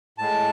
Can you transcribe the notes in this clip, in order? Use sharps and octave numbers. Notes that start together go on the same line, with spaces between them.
A2 G#3 A5